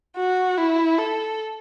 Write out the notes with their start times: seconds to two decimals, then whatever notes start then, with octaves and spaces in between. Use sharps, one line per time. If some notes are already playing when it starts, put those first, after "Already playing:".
0.16 F#4
0.57 E4
0.98 A4